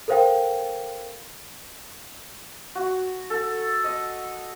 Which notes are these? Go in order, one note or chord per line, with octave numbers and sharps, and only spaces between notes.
A4 A#4 C5 F5 G5
F#4
A4
D#5